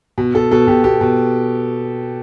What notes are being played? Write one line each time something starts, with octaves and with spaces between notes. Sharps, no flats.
B2
B2 A4
B2 A4
B2 G4
B2 G4
B2